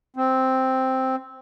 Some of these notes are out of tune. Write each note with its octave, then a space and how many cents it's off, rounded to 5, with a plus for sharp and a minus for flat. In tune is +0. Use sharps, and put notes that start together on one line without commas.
C4 +0